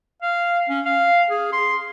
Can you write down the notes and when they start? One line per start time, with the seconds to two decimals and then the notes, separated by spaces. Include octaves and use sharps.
0.22 F5
0.69 C#4
0.85 F5
1.30 G#4
1.53 C6